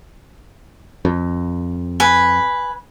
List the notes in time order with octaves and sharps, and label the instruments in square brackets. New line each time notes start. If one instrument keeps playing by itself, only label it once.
[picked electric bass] F2
[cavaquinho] B4 G#5